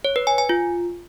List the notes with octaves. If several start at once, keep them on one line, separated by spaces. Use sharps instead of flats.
C#5
B4
G#5
G#5
F4